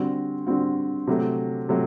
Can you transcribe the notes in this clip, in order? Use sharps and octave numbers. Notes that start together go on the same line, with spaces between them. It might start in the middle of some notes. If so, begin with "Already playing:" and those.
Already playing: D3 G3 C4 F#4
D3 G3 C4 F#4
C3 F#3 A3
C3 F#3 A3